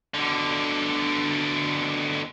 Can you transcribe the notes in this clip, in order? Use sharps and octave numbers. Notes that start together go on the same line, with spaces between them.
B2 D3